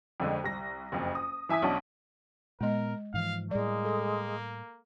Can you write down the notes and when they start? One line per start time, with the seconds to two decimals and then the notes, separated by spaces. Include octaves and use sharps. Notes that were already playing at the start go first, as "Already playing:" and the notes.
0.20 F2 D3 G#3
0.44 C2 A#6
0.92 F#1 F2
1.15 D#6
1.49 E3 E5 G#5 D#6 B6
1.62 B1 C#4 D4 F#5 A5
2.61 A#2 G#3 B3 A#4 D#5
3.14 G#2 E3 F3 F5
3.51 A2 G3 G#3 A#3 D5
3.85 A4